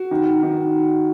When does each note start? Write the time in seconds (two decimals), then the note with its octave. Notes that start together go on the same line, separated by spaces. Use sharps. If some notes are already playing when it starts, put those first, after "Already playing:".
Already playing: F#4
0.11 D#3
0.43 D#3